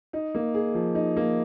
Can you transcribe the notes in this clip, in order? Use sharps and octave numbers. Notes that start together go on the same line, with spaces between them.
D#4
A#3
G#4
F3
D#4
A#3